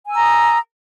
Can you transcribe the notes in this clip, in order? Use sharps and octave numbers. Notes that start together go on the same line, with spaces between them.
G#5 A#5 D#6 E6